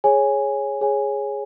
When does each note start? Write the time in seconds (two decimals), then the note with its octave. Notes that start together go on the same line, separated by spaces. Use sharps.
0.04 G#4 C#5 G#5
0.81 G#4 C#5 G#5